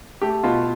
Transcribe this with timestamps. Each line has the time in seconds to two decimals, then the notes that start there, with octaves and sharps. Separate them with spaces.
0.22 A3 G4
0.43 B2 F4